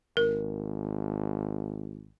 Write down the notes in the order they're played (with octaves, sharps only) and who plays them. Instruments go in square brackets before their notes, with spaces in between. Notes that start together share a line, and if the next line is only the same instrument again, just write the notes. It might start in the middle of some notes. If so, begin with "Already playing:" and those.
[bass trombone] G#1 [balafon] A#4